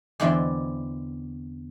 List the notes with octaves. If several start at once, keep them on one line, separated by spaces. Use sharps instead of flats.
E2 D3 C4 E4 D5 C6